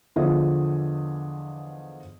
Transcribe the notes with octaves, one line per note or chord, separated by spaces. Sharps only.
E2 D3 F3 G#4 D#5